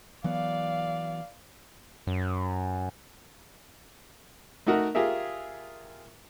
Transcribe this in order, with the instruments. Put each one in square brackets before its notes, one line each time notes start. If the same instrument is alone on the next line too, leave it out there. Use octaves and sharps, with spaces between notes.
[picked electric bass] E3 F#3 B3 [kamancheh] D5 F5
[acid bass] F#2
[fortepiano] A3 D#4 F#4 A#4
F4 G4 G#4 A#4 E5